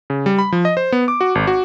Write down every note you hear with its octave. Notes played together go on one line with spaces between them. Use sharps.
C#3
G3
B5
F3
D#5
C5
B3
D6
F#4
G#1
F#4